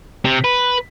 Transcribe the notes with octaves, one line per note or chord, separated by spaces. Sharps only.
C3
B4